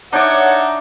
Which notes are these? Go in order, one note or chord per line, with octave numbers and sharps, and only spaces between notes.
D4 D#4 C#5 D5 E5 F#5